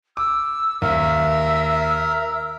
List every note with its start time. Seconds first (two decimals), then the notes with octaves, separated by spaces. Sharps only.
0.17 D6 E6
0.82 D#2 A#4 E5 E6